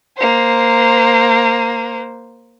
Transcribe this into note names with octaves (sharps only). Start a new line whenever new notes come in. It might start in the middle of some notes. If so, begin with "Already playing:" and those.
A#3 C5